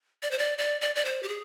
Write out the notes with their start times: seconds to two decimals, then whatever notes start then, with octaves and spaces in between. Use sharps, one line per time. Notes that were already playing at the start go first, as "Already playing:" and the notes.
0.23 D5
0.31 C5
0.38 D5
0.58 D5
0.81 D5
0.95 D5
1.05 C5
1.23 G4
1.28 G#4